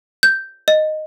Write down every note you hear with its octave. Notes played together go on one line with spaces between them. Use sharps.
G6
D#5